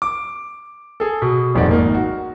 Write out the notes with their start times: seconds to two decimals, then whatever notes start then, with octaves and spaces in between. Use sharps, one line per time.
0.02 D6
1.00 G#4 A4
1.22 B2
1.55 D#1 F2 D#4 D5 F#5
1.69 G#1 A#3 D#4
1.94 F#4